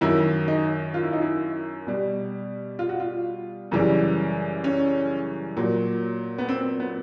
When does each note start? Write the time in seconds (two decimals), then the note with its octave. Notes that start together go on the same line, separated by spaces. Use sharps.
0.01 F#2 D#3 F#3 E4
0.48 D#4
0.94 F4
1.03 E4
1.13 D#4
1.22 E4
1.87 B2 G3
2.79 F4
2.89 F#4
3.00 F4
3.72 F#2 C#3 E3 G3
4.64 C#4
5.57 A#2 F#3
6.38 B3
6.49 C4
6.80 B3